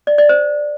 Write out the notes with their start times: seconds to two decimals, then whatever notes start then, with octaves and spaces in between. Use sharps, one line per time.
0.07 D5
0.18 D5
0.29 C5